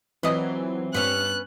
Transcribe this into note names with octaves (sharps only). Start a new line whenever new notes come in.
E3 F#3 C4 F4 B4 D#5
G2 B3 C#4 F#6